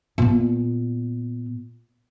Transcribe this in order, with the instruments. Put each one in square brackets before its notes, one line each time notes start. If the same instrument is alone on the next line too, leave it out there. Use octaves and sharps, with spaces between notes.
[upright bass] A#2 B3